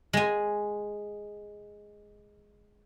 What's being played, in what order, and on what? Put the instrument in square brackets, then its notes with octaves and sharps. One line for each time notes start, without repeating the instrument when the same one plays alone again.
[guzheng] G#3 G#5